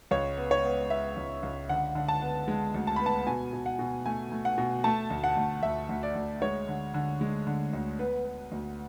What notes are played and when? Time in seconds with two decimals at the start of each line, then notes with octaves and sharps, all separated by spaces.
0.11 C#2 C#5
0.37 B3
0.51 C#5
0.65 B3
0.90 B3 E5
1.17 C#2
1.43 C#2
1.69 D3 F#5
1.95 D3
2.08 A5
2.22 B3
2.48 G#3
2.74 D2
2.87 A5
2.96 B3 B5
3.06 A5
3.27 B2 G#5
3.53 B2
3.66 F#5
3.79 B2
4.06 A3 G#5
4.32 A3
4.45 F#5
4.58 B2
4.84 A3 A5
5.10 D2
5.24 F#5
5.37 D2
5.63 D2 E5
5.89 D2
6.03 D5
6.15 D2
6.42 G#3 C#5
6.68 D3
6.94 D3
7.21 G#3
7.47 D3
7.73 D2
7.99 B3 B4
8.25 B3
8.52 D2